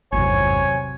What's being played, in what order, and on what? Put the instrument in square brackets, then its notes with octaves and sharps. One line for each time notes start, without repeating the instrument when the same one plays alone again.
[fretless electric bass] G#1 E2 G2 [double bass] C3 F#3 [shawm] C#5 [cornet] G#5